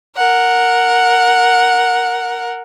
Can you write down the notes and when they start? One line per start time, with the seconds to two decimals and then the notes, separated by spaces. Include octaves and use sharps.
0.17 A#4 F#5